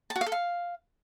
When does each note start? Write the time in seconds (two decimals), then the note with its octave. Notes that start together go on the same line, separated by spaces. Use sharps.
0.10 A5
0.16 F#4
0.21 F5
0.26 A4
0.32 F5